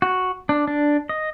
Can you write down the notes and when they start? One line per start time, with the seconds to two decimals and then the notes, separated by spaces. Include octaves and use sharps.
0.02 F#4
0.49 D4
0.68 D4
1.09 D#5